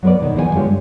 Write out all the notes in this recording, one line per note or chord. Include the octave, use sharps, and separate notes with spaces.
F#3 B3 A#4 B4 D5
F2 B2 D#3
E2 F3 C#5 G#5
E2 D3 G#3 F4 G4 C#5
G2